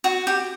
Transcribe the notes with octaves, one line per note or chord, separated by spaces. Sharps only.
F#4
G4